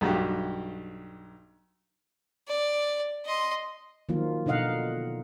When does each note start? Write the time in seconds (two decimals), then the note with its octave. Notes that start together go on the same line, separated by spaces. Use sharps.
0.01 B1 G2 F#4 G4
2.48 D5
3.25 D#5 C6
4.09 D#3 F3 F#3 A#3 F4
4.46 B2 D3 D#4 D#5 F5 F#5